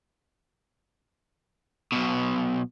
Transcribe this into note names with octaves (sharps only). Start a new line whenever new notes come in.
B1 B2